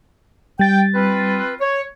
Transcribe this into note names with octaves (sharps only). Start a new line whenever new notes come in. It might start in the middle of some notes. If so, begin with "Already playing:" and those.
G3 G5 A6
C4 F4 B4
C#5